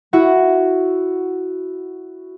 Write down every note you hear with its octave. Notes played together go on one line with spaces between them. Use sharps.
E4 F#4